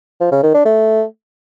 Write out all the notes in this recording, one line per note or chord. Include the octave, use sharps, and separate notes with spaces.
F3
C#3
D#3
D4
A3